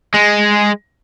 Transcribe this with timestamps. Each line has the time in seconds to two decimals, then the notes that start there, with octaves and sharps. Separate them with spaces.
0.14 G#3